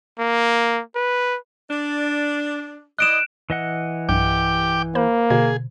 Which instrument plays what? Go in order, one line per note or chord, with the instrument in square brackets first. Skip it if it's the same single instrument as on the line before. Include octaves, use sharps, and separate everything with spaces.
[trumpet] A#3
B4
[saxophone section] D4
[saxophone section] E4 D5 D#5 [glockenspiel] F#6 D7 E7
[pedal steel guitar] E3 D#5 F#5
[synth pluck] B1 G2 [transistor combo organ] G5 D6
[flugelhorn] A#3 [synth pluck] C5 B5
[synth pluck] B2 D3 [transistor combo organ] G#4